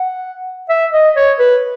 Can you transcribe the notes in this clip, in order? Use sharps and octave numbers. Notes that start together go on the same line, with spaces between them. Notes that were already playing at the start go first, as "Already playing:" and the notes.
Already playing: F#5
E5
D#5
C#5
B4